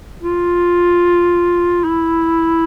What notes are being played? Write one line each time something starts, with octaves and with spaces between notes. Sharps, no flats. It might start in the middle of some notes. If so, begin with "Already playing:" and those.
F4
E4